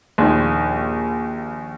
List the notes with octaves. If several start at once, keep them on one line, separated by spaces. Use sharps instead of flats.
A#1 D#2